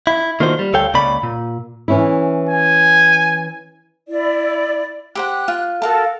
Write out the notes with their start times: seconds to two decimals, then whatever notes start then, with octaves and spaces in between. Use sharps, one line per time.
0.07 E4
0.40 D#3 A#3 D4 F4 F#4 C5
0.59 G3
0.74 D2 A4 C#5 F5 G5
0.94 C#2 C#3 A#3 C#4 D5 B5
1.23 A#2
1.88 E3 C#4 E4
2.49 G#5
4.07 E4 D5
5.15 G4 C5 F#5 F#6
5.48 F4
5.82 F#4 A4 A#4 F5 A5